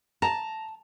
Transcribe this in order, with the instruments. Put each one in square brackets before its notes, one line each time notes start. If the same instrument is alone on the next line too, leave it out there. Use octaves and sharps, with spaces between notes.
[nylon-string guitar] A5 [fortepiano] A#5